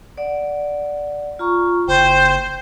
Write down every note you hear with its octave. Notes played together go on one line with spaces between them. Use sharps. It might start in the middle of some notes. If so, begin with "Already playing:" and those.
D5 F#5
F4 A#5 C#6
F#1 C5 G5